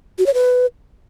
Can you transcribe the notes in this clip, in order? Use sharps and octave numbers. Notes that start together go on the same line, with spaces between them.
F#4
C#5
B4